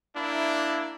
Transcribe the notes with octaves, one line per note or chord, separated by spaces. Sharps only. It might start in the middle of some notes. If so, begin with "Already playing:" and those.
A#3 D4 E4